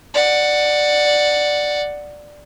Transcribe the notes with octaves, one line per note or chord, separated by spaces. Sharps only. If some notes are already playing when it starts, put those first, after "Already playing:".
D5 F#5